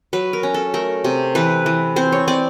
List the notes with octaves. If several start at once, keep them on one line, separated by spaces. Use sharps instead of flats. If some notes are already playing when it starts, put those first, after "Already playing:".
F#3 B4
A#4
C#4
A4
A3 A#4
C3
E3 B4
E3
C4 C5
C#5
C4 D5